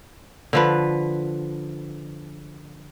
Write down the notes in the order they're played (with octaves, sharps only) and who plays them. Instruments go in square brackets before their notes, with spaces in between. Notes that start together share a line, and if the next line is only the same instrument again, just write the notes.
[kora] D3 F3 B4